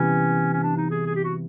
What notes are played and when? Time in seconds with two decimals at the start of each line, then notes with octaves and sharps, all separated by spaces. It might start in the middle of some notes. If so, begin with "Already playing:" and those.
Already playing: C3 E3 G3 B3 C#4 E4
0.53 C#4
0.63 D4
0.77 D#4
0.91 G#4
1.06 G#4
1.15 G4
1.24 F#4